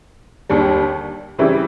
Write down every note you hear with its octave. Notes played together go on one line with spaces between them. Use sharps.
D#2 D3 G3
C#3 E3 G3 C4 E4